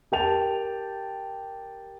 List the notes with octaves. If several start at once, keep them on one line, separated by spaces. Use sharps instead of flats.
G4 A#4 G5 A5 F7